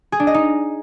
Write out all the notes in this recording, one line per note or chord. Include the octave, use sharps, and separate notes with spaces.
G#4
D4
D#5
D#4